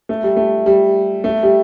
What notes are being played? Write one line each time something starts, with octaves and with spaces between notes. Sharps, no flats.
A3
G3
A3
G3
A3
G3